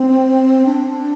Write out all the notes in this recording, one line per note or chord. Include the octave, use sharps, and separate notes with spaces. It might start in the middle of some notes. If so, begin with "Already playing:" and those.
Already playing: C4
D4